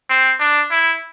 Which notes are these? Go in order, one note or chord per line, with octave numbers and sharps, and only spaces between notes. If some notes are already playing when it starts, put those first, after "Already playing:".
C4
D4
E4